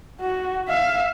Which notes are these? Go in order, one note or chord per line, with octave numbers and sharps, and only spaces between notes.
F#4
E5 F5